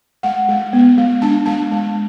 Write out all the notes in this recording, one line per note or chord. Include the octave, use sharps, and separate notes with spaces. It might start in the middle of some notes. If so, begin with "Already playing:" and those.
G#3 F#5
G#3
B3
G#3
D4 A5
G#3 A5
G#3